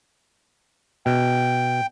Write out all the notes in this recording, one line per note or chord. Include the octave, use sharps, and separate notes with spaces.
B2 G5